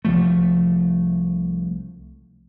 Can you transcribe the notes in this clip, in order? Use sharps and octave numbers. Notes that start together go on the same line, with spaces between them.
C2 F3 A3